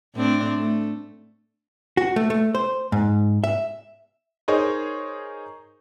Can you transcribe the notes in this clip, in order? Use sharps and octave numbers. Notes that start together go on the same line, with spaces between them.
A2 C4 D4
A3
F#4
A3
A3
C5
G#2
E5
D#4 G#4 A#4 C5 C#5